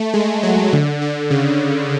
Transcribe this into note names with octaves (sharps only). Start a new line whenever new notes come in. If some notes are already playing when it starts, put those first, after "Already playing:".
Already playing: A3
G#3
F#3
D3
D3
C#3